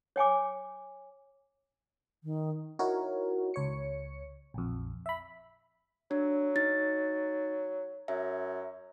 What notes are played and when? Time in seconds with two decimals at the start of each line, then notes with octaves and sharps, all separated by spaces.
0.16 C#5 G5 G#5 D6
2.24 D#3
2.79 D#4 E4 F#4 A#4 C#5
3.54 C#2 C#5 C#7
4.54 A#1 F2
5.06 E5 B5
6.11 F#3 D4
6.56 D#4 A6
8.08 F#2 E5